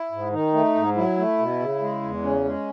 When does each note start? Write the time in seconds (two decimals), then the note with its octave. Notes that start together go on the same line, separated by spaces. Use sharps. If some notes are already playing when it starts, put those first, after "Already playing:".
Already playing: E4
0.12 G#2
0.32 D#3 D#4
0.54 A3
0.75 G#2
0.96 F#3 E4
1.18 A3
1.38 B2
1.60 C#3
1.81 G#3
2.02 E2
2.23 C#3 C#4
2.44 G#3